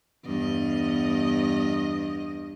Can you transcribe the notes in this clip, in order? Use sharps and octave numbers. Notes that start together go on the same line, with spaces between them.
E2 G2 D#5